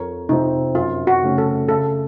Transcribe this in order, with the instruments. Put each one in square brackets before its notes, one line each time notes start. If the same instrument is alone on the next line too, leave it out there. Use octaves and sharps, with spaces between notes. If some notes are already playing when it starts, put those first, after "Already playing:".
Already playing: [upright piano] F2 [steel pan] A#4 C#5
[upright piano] C3 F3 C4 [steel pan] D#4
[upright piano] F#2 [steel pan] F4
[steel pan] F#4
[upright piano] C#3 A3 C#4
[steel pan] A4
[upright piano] C#3 [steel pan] A4